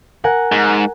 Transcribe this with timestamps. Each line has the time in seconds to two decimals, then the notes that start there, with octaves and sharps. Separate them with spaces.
0.24 A#4 F#5 G#5
0.52 G#2